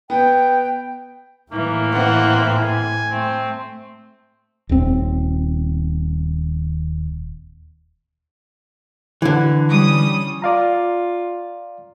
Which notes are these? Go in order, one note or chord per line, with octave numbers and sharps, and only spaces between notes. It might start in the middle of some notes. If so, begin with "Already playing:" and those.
B3 G5
A2 E3 A#3
E3 C4 F#5
G#5
A3 C4
D#1 C4
D3 E3
G3 C#4 D#6
F4 D5 F5 A#5